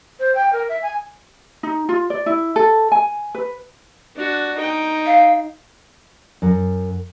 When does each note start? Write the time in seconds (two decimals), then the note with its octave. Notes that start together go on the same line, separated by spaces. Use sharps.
0.20 C5
0.35 G5
0.53 A#4
0.69 E5
0.83 G#5
1.63 D#4
1.89 F4
2.10 D5
2.26 E4
2.56 A4
2.92 G#5
3.35 B4
4.16 D4 F#4
4.57 D#4 G5
5.06 F5
6.42 F#2